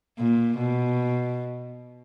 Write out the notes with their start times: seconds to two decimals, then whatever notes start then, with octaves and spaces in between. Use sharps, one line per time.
0.19 A#2
0.58 B2